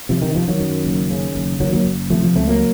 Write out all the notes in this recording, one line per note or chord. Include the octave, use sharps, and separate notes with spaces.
C3 F3
D#3
C3 F3
D#3 F#3
F#2
F#1
C#3
F#1
F#1 D#3 F#3
F#3 A#3
F#1
C3 F3 A3
F3
C#2 A3 C4
F#3 A#3